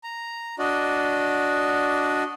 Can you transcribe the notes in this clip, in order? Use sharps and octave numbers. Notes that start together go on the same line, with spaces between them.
A#5
D4 F#4 D5 D#5